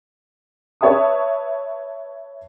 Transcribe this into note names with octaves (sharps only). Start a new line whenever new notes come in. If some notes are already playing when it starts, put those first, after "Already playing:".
B4 C#5 E5 A5 D#6